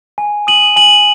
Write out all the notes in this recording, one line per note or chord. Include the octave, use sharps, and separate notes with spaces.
G#5
D#6 D#7 F#7
G#5 D#7 F#7